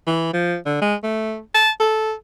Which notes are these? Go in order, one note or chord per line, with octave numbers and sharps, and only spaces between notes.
E3
F3
D3
G#3
A3
A5
A4